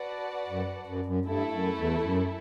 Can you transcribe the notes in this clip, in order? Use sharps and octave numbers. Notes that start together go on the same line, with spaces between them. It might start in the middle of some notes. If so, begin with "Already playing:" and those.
Already playing: F#4 B4 D5 F#5 A5
F#2
F#2
F#2
G2 A3 E4 A4
F#2
E2
F#2